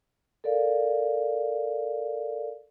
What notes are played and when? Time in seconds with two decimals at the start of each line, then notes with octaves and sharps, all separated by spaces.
0.44 A4 A#4 D5 F5